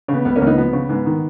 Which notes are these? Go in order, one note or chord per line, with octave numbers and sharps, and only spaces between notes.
C#3
B3
C#2 B3
A#3 C#4
C#2
B3 D#4
F3 B3
C#3
G#2 B3
D#3